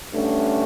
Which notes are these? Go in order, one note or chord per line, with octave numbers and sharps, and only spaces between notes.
G2 D3 A3 C#4